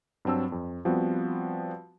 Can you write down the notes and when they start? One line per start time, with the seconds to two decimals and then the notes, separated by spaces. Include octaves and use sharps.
0.25 G2 F#3 C4 A5 E6
0.52 F2
0.85 F3 G3 B3 C4 F#4